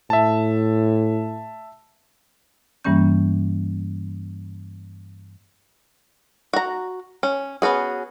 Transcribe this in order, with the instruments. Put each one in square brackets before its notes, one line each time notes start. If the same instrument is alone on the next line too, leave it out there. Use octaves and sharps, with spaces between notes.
[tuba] A2 [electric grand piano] E5 A5
[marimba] G2 E3 G3 A#3 C#4 G6
[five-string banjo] F#4 A#5
C#4
B3 C#4 F#4 G#4